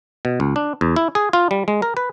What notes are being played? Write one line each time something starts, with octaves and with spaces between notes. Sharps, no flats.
B2
C#2
D4
E2
E4
G#4
F4
G3
G#3
A#4
B4